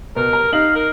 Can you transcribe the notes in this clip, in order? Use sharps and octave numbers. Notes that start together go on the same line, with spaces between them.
B2 A#4
A#5
D#4 F5 F#7
A#4